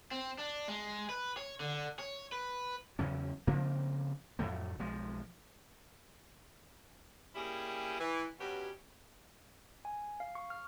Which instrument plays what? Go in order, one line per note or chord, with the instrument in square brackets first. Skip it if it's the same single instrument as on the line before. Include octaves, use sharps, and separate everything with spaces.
[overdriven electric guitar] C4
D4
G#3
B4
C#5
D3
C#5
B4
[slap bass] E2 C#3 F#3 C#4
C#3 F3 A#3 C4
F2 A2 F#3 A3
B1 F3 G#3
[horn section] G3 A#3 C#4 E4 G4 G#4
E3
G2 B2 F#3 B3 C#4 G4
[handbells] G#5
F5
C#6
F6